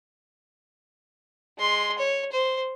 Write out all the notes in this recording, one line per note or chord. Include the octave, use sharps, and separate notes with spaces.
G#3 C6
C#5
C5